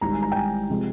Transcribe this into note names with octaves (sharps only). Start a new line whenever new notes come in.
G#1 G#2 G3 A#5
G#5
A#5
G5
G#5
C3 F3 G#3